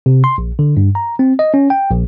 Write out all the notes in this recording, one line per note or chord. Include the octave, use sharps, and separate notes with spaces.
C3
C6
A#1
D3
G2
A#5
C4
D#5
C#4
G5
A#1